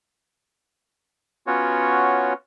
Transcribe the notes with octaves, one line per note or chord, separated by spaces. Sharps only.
B3 C#4 F4 F#4 C#5